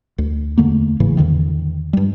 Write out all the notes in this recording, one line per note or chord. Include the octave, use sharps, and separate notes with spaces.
D2
E2 D3 A3 A#3
G#1 A2 C#3 E3
E2 B2 D3 D#3
G2 G3